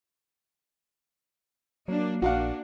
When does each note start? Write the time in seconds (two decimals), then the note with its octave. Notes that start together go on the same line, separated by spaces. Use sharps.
1.88 F#3 A#3 D4
2.22 A#1 A#3 D4 F#4 F5 F#5